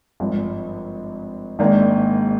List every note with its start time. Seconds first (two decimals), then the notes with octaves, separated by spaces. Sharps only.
0.20 G#1 G2 F3
1.59 G#1 G#2 D#3 A#3 D4